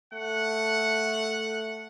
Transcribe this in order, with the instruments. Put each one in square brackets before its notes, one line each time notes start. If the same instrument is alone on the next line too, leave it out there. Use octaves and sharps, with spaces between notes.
[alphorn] A3 [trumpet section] F#5